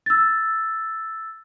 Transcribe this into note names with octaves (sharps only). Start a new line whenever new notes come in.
E6 A6